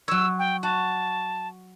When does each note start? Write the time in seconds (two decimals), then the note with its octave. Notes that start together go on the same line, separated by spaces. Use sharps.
0.08 F#3 C#5 E6
0.39 G5
0.63 F#4 A5